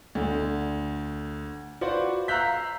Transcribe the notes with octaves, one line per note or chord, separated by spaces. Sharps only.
D2 D3
F4 F#4 B4 C5 D5 F#5
F5 A#5 E6 F#6 G6 B6